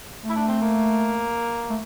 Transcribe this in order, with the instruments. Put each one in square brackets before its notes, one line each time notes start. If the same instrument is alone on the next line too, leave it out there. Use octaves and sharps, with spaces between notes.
[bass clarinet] A3
[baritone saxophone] E4
D4
C4
A#3
[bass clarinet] A3